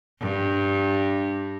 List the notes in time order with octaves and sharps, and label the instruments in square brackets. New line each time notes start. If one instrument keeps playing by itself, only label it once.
[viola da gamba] G2